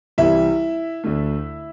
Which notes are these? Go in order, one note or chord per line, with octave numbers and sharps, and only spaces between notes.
C2 C3 E3 G3 E4 E5
D2 D3 A3